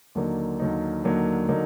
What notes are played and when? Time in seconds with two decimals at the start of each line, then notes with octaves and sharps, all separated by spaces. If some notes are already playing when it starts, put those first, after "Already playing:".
0.15 D#2 D3 F#3 A#3 D#4
0.60 D#2 D3 F#3 A#3 D#4
1.04 D#2 D3 F#3 A#3 D#4
1.48 D3 F#3 A#3 D#4